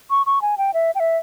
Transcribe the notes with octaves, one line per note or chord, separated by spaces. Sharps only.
C#6
C#6
G#5
G5
E5
G5
E5